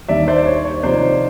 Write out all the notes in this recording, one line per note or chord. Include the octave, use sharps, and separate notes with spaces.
D#2 D#3 G3 A#3 D4 D5 E5
C5 D5
C#5
C#5
C3 F3 A#3 D#4 C5 D5